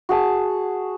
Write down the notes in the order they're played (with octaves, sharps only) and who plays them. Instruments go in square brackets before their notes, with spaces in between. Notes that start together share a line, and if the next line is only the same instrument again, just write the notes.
[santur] F#4 G#4 A5